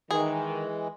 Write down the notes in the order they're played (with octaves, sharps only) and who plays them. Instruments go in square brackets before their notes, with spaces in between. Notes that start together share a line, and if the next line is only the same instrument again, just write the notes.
[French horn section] D#3 [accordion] E3 G#3 [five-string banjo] G#4